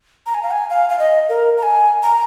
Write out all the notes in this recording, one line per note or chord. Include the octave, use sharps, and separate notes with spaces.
A#5
G#5
F5
G#5
F5
F5
D#5
A#4
A#5
G#5
A#5